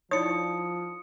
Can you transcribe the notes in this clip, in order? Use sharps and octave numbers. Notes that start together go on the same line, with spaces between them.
F3 D#4 E4 C#5 D5 D#6 C#7